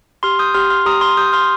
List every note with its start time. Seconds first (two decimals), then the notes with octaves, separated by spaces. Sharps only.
0.23 G4 C6 F6
0.39 D#6 G6
0.54 G4 C6 F6
0.70 C6 F6
0.86 G4 A#5 D#6
1.01 C6 F6
1.17 G4 D#6 G6
1.33 C6 F6